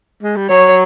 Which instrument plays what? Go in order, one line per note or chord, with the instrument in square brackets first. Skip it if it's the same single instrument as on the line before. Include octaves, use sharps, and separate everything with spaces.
[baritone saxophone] G#3
G3
[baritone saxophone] F#3 [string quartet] C#5